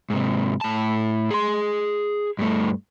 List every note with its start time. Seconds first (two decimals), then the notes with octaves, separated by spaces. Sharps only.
0.10 G#2 C3
0.61 A2 A5
1.31 G#4 C6
2.39 G2 A3